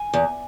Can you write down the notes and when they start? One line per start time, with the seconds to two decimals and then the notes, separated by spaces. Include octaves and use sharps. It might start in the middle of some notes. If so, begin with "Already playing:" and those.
Already playing: G#5
0.14 E2